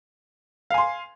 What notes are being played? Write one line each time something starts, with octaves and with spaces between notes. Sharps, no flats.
F5 G#5 C6